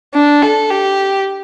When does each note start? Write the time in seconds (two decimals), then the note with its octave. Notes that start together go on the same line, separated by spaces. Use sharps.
0.14 D4
0.42 A4
0.70 G4